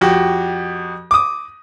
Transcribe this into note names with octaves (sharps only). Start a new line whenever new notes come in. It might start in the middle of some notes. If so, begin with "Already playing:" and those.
F2 F#4 G4
D6 D#6